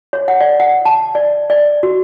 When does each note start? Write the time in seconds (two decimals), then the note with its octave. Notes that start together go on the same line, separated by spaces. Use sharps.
0.13 C#5
0.28 F#5
0.41 D5
0.60 F#5
0.85 A5
1.15 D5
1.50 D5
1.83 F#4